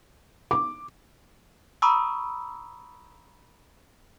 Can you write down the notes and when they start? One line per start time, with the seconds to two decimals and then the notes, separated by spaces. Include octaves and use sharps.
0.51 D6
1.82 A#5 B5 C#6 D#6 E6